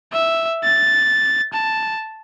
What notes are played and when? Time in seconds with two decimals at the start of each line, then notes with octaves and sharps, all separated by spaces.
0.13 E5
0.63 A6
1.53 A5